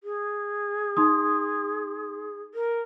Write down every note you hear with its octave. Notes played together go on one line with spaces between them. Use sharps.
G#4
D#4 C6 D#6
A#4